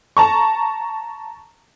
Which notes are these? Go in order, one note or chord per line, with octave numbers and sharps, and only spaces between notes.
A5 A#5 C#6